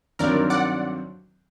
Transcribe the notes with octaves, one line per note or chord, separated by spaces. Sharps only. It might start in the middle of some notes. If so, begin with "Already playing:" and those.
G2 D#3 F#3 C4 A#4 D5
D5 F#5